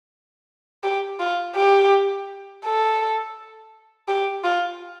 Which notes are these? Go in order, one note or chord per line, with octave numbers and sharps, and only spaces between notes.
G4
F4
G4
A4
G4
F4